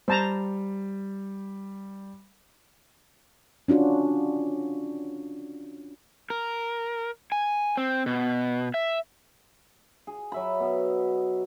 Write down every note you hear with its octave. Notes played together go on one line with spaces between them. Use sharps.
G3 C5 A5 A#5
C#4 D4 F4 F#4
A#4
G#5
C4
B2
E5
G#4
F#3 E5 B5
B2